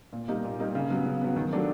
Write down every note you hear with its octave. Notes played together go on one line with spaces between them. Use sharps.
A#2
G3 A#3 D#4 G4
A#2
G3 A#3 D#4 G4
C#3
F#3 B3
C#3
F#3 B3
D#3
F#3 A3 D4 G4